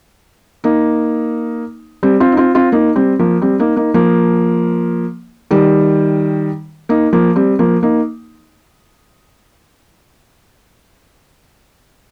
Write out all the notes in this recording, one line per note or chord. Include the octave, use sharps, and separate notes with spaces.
A#3 D#4
G3 C4
C4 F4
D#4
C4 F4
C4 F4
A#3 D#4
G3 C4
F3 A#3
G3 C4
A#3 D#4
A#3 D#4
F3 A#3
D#3 G3
A#3 D#4
F3 A#3
G3 C4
F3 A#3
A#3 D#4